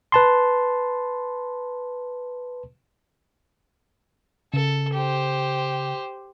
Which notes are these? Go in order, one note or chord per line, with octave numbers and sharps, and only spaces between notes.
B4 A5 C6
C#3 A4
G4 C5